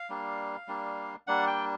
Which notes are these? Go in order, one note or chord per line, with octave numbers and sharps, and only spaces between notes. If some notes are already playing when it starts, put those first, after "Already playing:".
Already playing: F5
G3 A#3 D4
G3 A#3 D4
G3 A#3 D4 F#5
G5